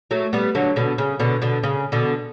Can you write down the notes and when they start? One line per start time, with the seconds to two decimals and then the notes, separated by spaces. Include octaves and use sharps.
0.11 F#3 A3
0.33 G3 B3
0.55 D3 F#3
0.76 B2 D3
0.98 C#3
1.20 B2 D3
1.42 B2 D3
1.63 C#3
1.92 B2 D3